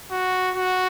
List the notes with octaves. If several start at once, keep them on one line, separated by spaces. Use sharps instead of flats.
F#4
F#4